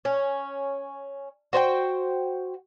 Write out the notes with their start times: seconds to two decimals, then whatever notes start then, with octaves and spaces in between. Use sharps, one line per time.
0.05 C#4
1.53 F#4 C5 C#5 G5